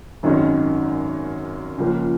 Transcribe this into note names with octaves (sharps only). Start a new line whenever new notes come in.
G#1 F#2 D#3 G#3 C#4
C#2 C#3 F3 A#3 C#4